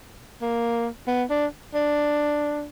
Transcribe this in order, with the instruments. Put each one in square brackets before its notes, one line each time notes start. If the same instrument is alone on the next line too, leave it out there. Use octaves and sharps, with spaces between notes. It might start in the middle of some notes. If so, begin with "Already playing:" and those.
[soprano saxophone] A#3
B3
D4
D4